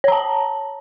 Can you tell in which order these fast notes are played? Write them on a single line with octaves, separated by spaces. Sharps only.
C#5 A#5 A5